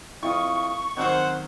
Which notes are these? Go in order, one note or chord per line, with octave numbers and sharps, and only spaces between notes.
F2 E4 F5 C#6 D#6
D#3 F#3 C4 F#4 C5 F#5